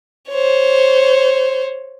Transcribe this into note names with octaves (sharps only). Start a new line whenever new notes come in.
C5 C#5